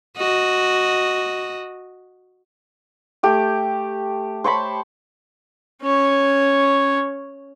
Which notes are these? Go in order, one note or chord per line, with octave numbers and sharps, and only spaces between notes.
F#4 D#5
A3 G4
C5 C#5 A5 B5
C#4 C#5